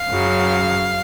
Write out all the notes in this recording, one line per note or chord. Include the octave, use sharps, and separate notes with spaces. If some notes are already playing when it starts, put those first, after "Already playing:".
Already playing: F5
F#2 C#3 F#3